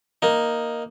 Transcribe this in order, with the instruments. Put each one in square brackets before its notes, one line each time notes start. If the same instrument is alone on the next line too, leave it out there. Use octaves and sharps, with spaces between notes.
[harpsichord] A#3 D#4